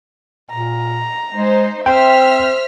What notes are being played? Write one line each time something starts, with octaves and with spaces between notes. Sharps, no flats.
A#2 A#5
G#3 D#4 C5
C4 C5 E5 G5 F6 B6